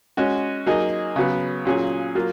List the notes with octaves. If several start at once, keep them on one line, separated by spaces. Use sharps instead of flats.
G#3 C#4 F#4
F#3 A#3 D#4 G#4
C#3 F#3 B3
A#2 F#3 C#4 G#4
F#3 A#3 F4